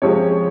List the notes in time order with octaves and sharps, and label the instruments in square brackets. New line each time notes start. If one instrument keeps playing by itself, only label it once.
[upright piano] C3 F3 G#3 C#5